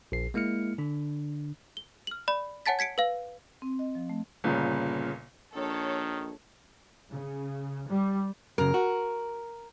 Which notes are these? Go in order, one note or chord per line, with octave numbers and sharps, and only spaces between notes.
A#1 C7
G#3 A#3 E4 F6 C#7
D3 D4
G7
F6 F#7
D5 B5
C#5 F#5 G#5 A5 A6 B6
G#6 B6 C#7 D7
B4 F5
C4
D#5
F3
A3
G1 A#2 C#3
A#1 D#3 A4 C#5
C#3
G3
F#2 C#3 A#4
F#4